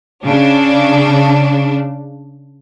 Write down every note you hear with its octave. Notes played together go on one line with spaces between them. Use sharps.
C#3 D4